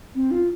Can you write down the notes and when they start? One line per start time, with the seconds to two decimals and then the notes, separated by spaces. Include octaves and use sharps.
0.15 C4
0.31 F4